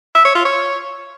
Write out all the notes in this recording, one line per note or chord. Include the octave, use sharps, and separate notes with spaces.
E5
C#5
F4
C#5